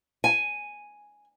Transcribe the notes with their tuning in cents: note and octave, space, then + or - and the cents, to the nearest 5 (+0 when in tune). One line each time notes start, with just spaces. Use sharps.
G#5 +0